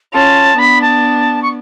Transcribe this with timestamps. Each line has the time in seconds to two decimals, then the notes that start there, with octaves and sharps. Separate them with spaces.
0.14 C#4 F4 A5
0.58 B3 D4 B5
0.81 A5
1.42 C#6